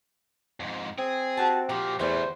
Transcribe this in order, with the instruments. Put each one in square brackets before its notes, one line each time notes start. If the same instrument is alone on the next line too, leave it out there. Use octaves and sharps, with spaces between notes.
[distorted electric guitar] F2 G#2
[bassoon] C4 [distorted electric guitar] G#4
[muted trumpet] F#4 [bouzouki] G4 A5
[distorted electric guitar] A#2 F3 [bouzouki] F#4 [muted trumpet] G4
[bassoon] E2 [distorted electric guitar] E3 A3 [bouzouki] G3 F#4 [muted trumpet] C5